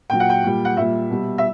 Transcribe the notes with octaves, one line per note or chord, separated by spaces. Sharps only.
A#2 F#3 G5
F#5
G5
A#2 G3
F#5
A#2 G3 E5
B2 G3
E5